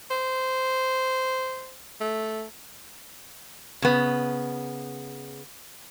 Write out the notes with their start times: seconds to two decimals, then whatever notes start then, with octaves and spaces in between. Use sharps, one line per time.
0.11 C5
2.00 A3
3.82 C#3 B3